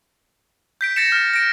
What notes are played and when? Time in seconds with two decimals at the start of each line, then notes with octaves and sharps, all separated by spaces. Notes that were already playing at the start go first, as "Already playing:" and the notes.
0.81 G6 B6 D7
0.96 G6 A6 A#6 C#7 E7
1.12 F6
1.34 A#6 D7